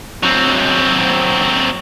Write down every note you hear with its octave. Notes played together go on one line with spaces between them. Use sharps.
F#3 C4